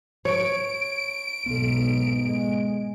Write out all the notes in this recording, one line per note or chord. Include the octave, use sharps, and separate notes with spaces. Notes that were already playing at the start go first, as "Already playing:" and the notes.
C#5 D7
B1 G#2 B3 A4
G#3